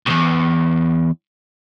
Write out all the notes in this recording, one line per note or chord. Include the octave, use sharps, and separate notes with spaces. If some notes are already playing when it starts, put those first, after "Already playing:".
B1 E2